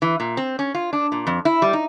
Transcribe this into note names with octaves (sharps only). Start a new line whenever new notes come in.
E3
A#2
C4
C#4
F4
D4
A#2
F2
E4
G3
D#4